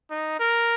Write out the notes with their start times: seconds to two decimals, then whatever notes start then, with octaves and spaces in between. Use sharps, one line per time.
0.10 D#4
0.40 A#4